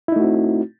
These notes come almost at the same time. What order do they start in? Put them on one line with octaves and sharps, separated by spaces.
E4 D#4 A3 F#4 C4